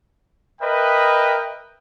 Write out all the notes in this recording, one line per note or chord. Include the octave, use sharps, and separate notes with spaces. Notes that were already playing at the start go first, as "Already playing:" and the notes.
A#4 B4 D#5 E5 G5 B5